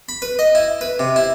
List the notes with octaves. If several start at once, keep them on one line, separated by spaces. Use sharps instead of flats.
B5
B4
D#5
E4
B4
C3
E4